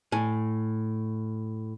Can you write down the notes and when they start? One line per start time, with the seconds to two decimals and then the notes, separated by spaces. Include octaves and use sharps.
0.12 A2 G#5